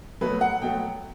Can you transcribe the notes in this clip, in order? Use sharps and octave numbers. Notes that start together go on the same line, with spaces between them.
B2 F#3 A3 B4
F#5
B2 F#3 A3 G5